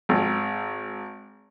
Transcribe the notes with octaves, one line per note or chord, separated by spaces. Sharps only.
G#1